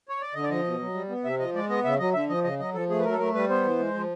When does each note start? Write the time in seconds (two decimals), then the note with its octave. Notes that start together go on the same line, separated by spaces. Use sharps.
0.09 C#5
0.21 D5
0.34 D3 D#5
0.43 D5
0.50 F3 D#5
0.64 B2
0.79 F#3
0.94 G3
1.09 B3
1.24 C3 E5
1.39 F3 D#5
1.54 G#3 D5
1.69 B3 D#5
1.84 C#3 E5
1.99 F#3 D#5
2.14 D3 E5
2.29 F3 D#5
2.44 C#3 D#5
2.59 F#3 D#5
2.74 F3 A4
2.89 A3 G#4
2.99 B4
3.04 F#3 A#4
3.12 A4
3.19 A3 A#4
3.34 G3 B4
3.49 B3 C5
3.64 E3
3.79 G#3
3.94 F3